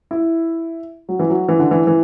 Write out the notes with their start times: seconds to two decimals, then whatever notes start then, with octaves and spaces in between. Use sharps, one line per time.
0.11 E4
1.09 F#3
1.19 E3
1.29 F#3
1.48 E3
1.59 D3
1.71 E3
1.87 E3